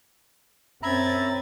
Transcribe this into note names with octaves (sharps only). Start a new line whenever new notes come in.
F#2 C4 C#4 E5 A#5 B5 G#6 A6